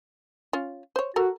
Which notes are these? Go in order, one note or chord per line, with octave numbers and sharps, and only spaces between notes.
C#4 F4
C5 C#5
F#4 A4 A#4